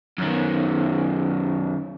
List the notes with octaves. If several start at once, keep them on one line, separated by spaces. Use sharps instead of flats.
F#2 D#3